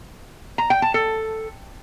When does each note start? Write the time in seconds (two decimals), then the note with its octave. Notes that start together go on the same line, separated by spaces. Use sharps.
0.58 A#5
0.70 G5
0.82 A5
0.94 A4